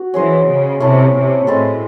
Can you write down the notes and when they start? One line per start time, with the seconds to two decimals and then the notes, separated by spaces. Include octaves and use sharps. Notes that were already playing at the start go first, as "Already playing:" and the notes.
Already playing: F#4
0.14 E3 C#4 G#4 C5 D#5
0.48 C#3
0.80 C3 A3 C#4 E4
1.14 C3
1.47 A2 G#3 C4 E4 A4